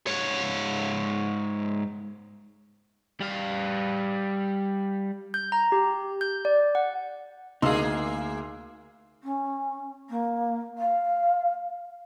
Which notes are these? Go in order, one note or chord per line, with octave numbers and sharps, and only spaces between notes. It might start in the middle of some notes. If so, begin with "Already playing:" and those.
G#2 C#5
G3 F5
G6
A#5
G4
G6
D5
F#5
D2 A#3 D#4 G#4 F5 C6 E6
C#4
A#3
F5